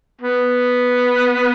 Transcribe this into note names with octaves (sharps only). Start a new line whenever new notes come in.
B3